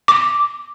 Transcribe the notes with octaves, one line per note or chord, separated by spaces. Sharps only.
D6